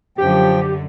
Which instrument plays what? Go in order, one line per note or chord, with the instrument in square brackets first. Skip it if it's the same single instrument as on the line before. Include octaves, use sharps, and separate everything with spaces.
[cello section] F#2 D3 F#3 [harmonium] F3 G5 [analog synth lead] G4